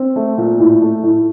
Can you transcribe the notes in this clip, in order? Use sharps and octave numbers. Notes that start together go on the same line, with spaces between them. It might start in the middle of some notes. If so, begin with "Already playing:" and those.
Already playing: C4
A3
A#2
A2
A3
A2